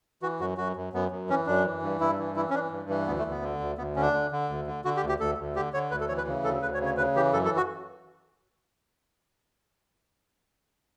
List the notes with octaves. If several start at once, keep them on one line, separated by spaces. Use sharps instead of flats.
E3 F#4
F#2 F#4
F#2 F#4
F#2
F#2 B3
F#2
E3 C#4
F#2 D4
E3
G2
G2 E4
E3
E3 E4
C#4
E3 D4
G2
E3
D2 B3
A3
D2
B3
D3
D2
D2 B3
D3 C#4
D4
D3
D3
D2
D3
D3 F#4
G4
D2
G4
D2 A4
D2
D3 G4
D3 C#5
D2 B4
A4
E3 C#5
B4
C#3
D2 A4
D2 B4
C#5
C#3
C#5
C#3 B4
E3 G4
F#2 A4
A4
F#4